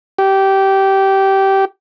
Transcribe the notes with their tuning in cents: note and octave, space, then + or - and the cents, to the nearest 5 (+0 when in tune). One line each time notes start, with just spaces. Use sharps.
G4 -15